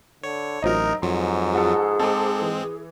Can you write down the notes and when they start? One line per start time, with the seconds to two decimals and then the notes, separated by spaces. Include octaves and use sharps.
0.24 D3 C#5
0.62 A1 F#3 C4 D#4 A#4 D#5
1.02 F2 G#2 F#3 C6
1.53 F3 F#4 G#4 A4
2.00 G#3 C4 A4 D6
2.42 E3